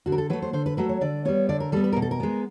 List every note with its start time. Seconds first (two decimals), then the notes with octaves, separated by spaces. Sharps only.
0.06 D3 F#4
0.12 A#4
0.18 A4
0.30 F#3 A3 B4
0.42 C5
0.53 D3 C5
0.66 B4
0.77 F#3 A3 B4
0.89 C#5
1.01 D3 D5
1.25 G3 B3 C#5
1.49 D3 D5
1.60 A#4
1.72 G3 B3 A4
1.84 B4
1.92 A#4
1.96 B2
2.02 A4
2.11 A#4
2.20 G#3 B3